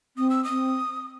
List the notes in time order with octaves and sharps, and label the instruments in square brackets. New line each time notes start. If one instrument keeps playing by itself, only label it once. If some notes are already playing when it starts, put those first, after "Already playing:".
[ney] C4 [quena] D#6
[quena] E6
[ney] C4 [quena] D#6